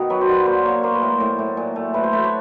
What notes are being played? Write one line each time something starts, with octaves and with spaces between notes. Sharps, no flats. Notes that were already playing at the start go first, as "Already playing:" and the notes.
Already playing: B2 D#3
F#3 B4
C5
D3 B4
A#3 C5
A#3 C#5
A#3 C5
B4
A2 A#4
A2
A2
A#2
A3
A3 B4
C5
A3 B4
C#5